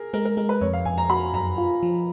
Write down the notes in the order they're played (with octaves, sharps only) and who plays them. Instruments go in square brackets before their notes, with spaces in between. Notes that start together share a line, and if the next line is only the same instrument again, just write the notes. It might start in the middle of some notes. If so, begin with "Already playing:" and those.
Already playing: [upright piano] G#4 A#4
[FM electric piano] G#3 [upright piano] A#4
[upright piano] A#4
[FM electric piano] G#3 [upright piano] A#4
[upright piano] B4
[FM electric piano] F2 [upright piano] C#5
[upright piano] F5
[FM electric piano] F2 [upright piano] G#5
[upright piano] A#5
[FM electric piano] F#4 [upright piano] B5
[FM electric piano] F#2 [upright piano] A#5
[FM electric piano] F4
F3